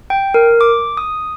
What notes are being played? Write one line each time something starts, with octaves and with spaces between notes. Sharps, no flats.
G5
A#4
D6
D#6